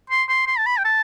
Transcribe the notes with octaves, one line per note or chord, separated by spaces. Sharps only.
C6
C6
C6
A5
B5
G5
A5